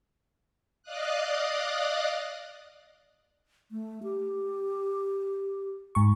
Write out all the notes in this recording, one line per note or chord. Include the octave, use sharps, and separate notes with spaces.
D5 D#5 F5 D#6 F#6
A3
G4
G#2 C#6